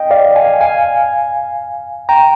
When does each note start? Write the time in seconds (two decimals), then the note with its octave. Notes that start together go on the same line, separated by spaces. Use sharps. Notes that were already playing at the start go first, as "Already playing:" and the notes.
Already playing: D#5 G5
0.11 D5 F5
0.36 F5 G#5
0.61 F5 G#5
2.09 G5 A#5